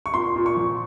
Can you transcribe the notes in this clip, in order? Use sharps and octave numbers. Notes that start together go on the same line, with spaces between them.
C#6
A#2 C6
A#2
C#6
F3